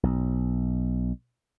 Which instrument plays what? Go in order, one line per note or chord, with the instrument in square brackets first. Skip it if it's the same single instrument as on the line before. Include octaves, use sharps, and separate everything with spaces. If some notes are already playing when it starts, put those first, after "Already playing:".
[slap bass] B1